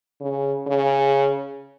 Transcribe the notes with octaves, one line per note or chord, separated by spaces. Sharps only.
C#3
C#3